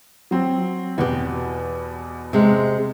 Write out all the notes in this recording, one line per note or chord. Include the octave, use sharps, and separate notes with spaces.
F#3 C4
E2 B2 F#4 G4
C3 G#3